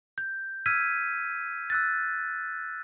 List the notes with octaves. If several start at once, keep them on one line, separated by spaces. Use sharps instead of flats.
G6
E6 F6 G#6 B6 D#7
E6 F#6 A6